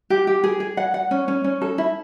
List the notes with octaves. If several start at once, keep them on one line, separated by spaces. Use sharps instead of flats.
G4
G4
G#4
G#4
F#5
F#5
C#4
C#4
C#4
A4
E4